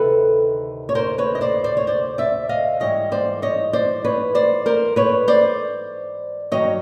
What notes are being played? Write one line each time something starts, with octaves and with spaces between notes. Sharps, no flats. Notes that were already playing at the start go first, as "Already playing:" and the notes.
Already playing: D2 C3 D#3 A4 B4
C#5
A#4 C5
B4 C#5
D#5
C5 D5
C5 D5
C#5
C5 D5
D5 E5
D#5 F5
G#2 E3 G3 C#5 D#5
C5 D5
C#5 D#5
C5 D5
B4 C#5
C5 D5
A#4 C5
B4 C#5
C5 D5
G2 D#3 F#3 C#5 D#5